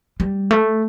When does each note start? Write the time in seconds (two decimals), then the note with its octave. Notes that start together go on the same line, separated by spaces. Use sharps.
0.20 G3
0.51 A3